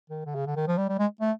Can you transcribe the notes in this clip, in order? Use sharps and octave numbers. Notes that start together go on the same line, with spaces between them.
D#3
D3
C#3
D3
D#3
F3
G3
G3
G#3
A3